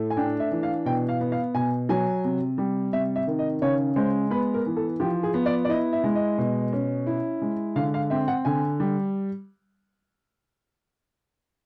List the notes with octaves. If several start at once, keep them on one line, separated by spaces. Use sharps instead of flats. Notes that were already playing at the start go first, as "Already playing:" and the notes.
Already playing: A2 A3
G#5
D4 G5
E5
E3
F5
B2 G5
F5
B3
F5
B2 G#5
F#3 G#5
C3
G3
C3 E5
E5
D#3
D#5
C#3 C#5
G#3 C5
B3 B4
A#4
E3
A4
F3 G4
G#4
B3
D5
D5
E4 D#5
E5
G#3
D#5
B2
C#4
E4
G#3
D3 F5
F5
C4 E5
F#5
D3 G#5
G3